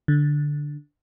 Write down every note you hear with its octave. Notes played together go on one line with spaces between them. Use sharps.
D3